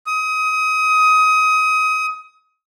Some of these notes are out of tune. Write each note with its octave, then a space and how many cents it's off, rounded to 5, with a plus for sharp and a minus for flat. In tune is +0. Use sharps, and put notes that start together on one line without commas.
D#6 +25